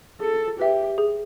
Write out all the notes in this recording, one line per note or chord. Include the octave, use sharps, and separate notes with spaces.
G#4 A4
G4 B4 E5 G5
G#4